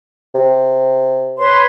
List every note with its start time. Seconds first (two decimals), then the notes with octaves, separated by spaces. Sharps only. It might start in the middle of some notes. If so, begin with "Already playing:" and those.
0.35 C3
1.38 B4 C#5 C6